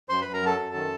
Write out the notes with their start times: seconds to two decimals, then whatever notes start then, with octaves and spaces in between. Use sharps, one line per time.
0.09 F#2 C5 C6
0.21 F#2 B4 B5
0.34 A#4 A#5
0.42 F#3 A4 A5
0.58 F#2
0.75 D#3